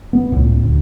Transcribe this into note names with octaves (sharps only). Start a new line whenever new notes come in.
B3
C#2 A2
D2